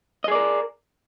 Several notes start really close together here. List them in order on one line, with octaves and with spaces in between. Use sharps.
D#5 G#4 D5 A#4